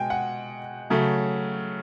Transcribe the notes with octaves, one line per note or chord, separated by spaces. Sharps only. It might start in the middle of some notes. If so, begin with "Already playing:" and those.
Already playing: B2 G#3 G5 G#5
F#5
C#3 F#3 A3